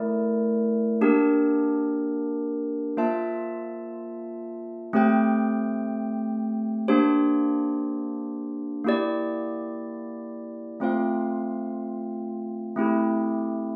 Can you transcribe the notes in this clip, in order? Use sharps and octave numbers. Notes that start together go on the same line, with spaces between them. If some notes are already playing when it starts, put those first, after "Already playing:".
Already playing: A3 E4 A#4 D5
A#3 D4 G4 A#4
A#3 F4 C5 E5 A5
A3 C4 G4 C5 G5
A#3 D4 G4 C5
A#3 E4 G4 D5
A3 C4 F4 C5 F5
A3 C4 E4 G4